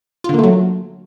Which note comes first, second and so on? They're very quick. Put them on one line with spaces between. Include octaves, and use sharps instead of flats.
F4 D3 A#3 A3 F#3